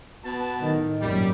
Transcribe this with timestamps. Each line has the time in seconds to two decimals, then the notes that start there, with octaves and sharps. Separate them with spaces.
0.25 B2 B3 A5
0.62 A2 D#3
1.01 G#1 F#2 A#2 G3